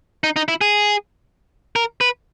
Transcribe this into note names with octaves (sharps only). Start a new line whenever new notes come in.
D#4
D#4
E4
G#4
A#4
B4